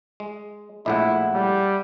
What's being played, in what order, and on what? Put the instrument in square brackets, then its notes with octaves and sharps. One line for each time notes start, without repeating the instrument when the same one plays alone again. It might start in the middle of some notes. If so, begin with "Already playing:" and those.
[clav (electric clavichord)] G#3
[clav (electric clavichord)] A#1 A2 G#3 [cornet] E4 [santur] E5 F#5
[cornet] G3